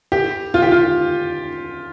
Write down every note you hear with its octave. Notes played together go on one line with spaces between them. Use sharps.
G4
F4
G4
F4